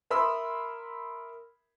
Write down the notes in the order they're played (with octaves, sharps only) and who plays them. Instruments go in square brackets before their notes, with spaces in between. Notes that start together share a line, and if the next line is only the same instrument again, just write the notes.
[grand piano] A#4 E5 B5 C6 D#6 E6